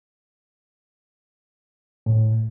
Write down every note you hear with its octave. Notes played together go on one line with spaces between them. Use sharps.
A2